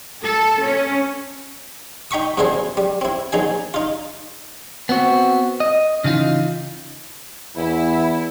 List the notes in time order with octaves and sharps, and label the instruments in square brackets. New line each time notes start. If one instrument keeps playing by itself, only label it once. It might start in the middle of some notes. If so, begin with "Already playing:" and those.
[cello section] A4
C#4
[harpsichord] D#4 G5 B5 C#6 D#6
G2 B2 D3 E4 G#4 C5
G3
C4 E4
A#1 D#4 G#4 G#5
D#4 F4
[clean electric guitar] B3 C4 F#4
D#5
C#3 E3 D#4 F4
[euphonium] E2 [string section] E4